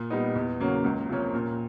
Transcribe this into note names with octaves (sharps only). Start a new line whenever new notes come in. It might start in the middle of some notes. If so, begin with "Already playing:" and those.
Already playing: A#2
G3 B3 D#4
E2
C#3 F#3 A#3 C#4
C#2
C3 F3 A#3 C#4
A#2